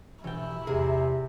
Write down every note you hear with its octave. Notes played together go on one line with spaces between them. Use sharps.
G2 B2 E3 E4 G5
E2 G#2 C3 G#4 A#4